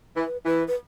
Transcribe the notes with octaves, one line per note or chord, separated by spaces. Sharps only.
E3 B4
E3 B4
B4